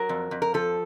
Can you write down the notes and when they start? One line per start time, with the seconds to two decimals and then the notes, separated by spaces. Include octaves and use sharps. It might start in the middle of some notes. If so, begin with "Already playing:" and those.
Already playing: F#3 A#4
0.09 F2
0.31 F2
0.42 A#4
0.54 F3 A4